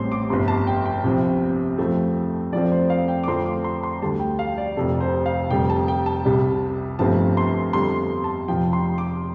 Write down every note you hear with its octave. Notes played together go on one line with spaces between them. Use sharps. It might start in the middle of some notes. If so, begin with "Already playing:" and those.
Already playing: A1 A2 G3 C4 C6
D6
G1 F2 C3 C6
A5
G5
G5
C2 C3 F3 C4
F2 F3 A3 C4
F2 F3 A3 C4 D5
C5
F5
G5
D6
F2 D3 F3 A3 C4 C6
D6
C6
C6
D2 D3 G3 A5
G5
F5
D5
F1 F2 C3 A4
C5
F5
F1 F2 D3 G3 G5
A5
G5
A5
C2 C3 G3
G1 G2 F3 A3 C4 A5
C6
F2 D3 G3 C6
A5
F1 F2 F3 G5
C6
D6